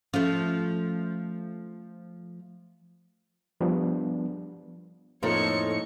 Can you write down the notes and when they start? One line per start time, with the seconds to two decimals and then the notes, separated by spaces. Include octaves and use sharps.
0.14 F3 A3 C#4
3.61 F3 G3 B3 D4
5.23 F2 A2 A#3 D#4 F4 A4 C#5 C#6